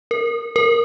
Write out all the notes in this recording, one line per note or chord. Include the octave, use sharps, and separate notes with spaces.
A#4
A#4